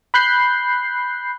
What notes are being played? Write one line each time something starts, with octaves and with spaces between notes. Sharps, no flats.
B5 F#6 G6 C7